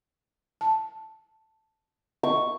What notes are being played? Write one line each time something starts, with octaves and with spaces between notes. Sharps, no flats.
A5
D#5 C#6